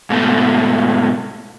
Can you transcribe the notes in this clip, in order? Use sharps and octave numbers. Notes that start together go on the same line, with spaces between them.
G#2 B2 A3